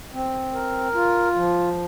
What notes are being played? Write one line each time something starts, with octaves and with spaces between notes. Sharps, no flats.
C4
A#4
F4
F3